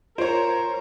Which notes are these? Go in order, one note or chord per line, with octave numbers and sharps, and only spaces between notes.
F4 A#4 C5 C#5